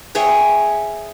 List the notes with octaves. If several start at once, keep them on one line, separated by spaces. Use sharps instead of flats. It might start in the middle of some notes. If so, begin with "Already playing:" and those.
G#4 C#5 E5 G5